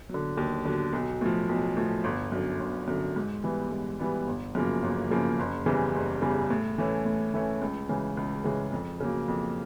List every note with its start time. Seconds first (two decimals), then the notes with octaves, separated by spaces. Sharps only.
0.09 D3 F#3
0.37 D#2
0.65 D3 F#3
0.93 B1
1.21 A2 F3
1.49 B1
1.77 A2 F3
2.04 G1
2.32 F#2 D3
2.60 G1
2.88 F#2 D3
3.16 G#2
3.44 E3 G3 B3
3.71 G#2
3.99 E3 G3 B3
4.27 G1
4.55 F#2 C#3 F3 A#3
4.83 G1
5.11 F#2 C#3 F3 A#3
5.39 F#1
5.66 E2 C#3 E3 G3
5.95 F#1
6.22 E2 C#3 E3 G3
6.50 A2
6.78 E3 A3 C#4
7.05 A2
7.34 E3 A3 C#4
7.61 C#2
7.89 C#3 E3 G#3 C#4
8.17 C#2
8.44 C#3 E3 G#3 C#4
8.72 F2
9.00 C#3 F#3 A#3
9.28 F2